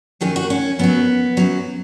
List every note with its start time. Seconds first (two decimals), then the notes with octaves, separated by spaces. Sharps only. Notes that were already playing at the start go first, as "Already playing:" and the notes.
0.21 F#2 D#3 F#3 G#4
0.36 F#4
0.50 C#4
0.79 F#2 F#3 B3
1.37 F#2 F#3